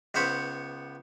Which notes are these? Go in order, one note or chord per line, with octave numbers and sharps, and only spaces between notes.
C#2 B3 C5 C#5 B5